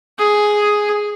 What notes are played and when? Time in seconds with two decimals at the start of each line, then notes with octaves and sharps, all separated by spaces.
0.18 G#4